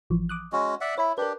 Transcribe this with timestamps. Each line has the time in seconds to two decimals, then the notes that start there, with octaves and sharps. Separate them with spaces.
0.10 A1 E3 F3
0.29 D6 D#6 F#6
0.52 G#3 C#4 F#4
0.81 D5 E5 F#5
0.98 E4 C#5 B5
1.18 D4 G4 A#4 B4